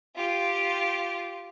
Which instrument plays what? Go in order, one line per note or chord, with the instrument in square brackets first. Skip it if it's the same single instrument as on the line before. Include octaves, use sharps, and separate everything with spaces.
[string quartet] F4 G4